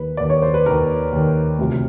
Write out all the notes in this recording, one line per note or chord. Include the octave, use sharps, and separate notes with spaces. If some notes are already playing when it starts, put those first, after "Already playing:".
Already playing: D#2 D#3 B4
D#2 D#3 D5
C#5
C5
B4
D#2 D#3 A#4
D#2 D#3
D2 C3 F3